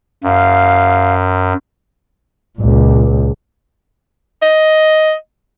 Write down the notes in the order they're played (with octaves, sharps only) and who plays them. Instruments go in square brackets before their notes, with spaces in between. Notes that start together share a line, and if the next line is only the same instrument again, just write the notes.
[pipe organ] F#2 [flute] F5
[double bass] C#2 A#2
[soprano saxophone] D#5